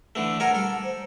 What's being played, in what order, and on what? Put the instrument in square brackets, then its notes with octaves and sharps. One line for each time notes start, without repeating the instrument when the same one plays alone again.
[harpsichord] D3 E3 A3
[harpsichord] A4 A#4 G#5 [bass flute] F#5
[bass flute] G3 [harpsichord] A4
[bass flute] C5